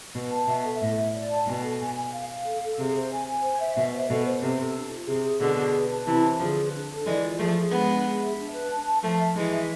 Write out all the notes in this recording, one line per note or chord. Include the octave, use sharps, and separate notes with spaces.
B2 B4
A5
B2 E5
A4
A2 E5
E5
D5
A5
B2 G#5
A4
G#5
G#5
F5
F5
A4
A4
C3 G#4
C5
G#5
G#5
C5
E5
B2 E5
C5
B2 A4
C5
C3 A4
A4
D4
F4
C3 G#4
G#4
B2 D3 G#4
G#4
B4
A5
C3 E3 E4
C5
D3 F3 G#4
B4
D4
A4
E3 G#3 D5
F4
F3 A3 G#4
G#4
G#3 B3 D4
D4
G#4
E5
D4
B4
A5
A5
F3 A3 A5
E5
E3 G#3 G#4
E5